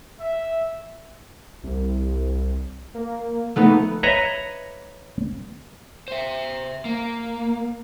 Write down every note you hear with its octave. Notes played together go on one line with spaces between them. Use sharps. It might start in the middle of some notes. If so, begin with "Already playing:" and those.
E5
C2
A#3
F3 A3 B3 D#4
B4 C#5 D#5 E5 A#5
C5 E5
A#3